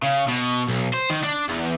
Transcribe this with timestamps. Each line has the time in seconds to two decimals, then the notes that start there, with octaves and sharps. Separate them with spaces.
0.02 C#3
0.28 B2
0.68 B1
0.94 C5
1.10 D#3
1.24 D4
1.49 E2